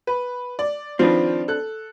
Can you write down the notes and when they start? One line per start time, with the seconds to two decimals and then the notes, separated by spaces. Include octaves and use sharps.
0.07 B4
0.59 D5
0.99 D#3 F3 C4 D4 F4 B4
1.48 A4 F#6